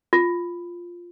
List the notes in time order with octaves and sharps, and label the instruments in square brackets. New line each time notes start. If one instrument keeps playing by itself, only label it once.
[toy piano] F4